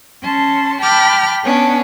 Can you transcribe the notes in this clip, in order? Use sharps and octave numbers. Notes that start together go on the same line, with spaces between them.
C#4 A5 C6
G5 A5 B5 D6 F6 G6
B3 C#4 D4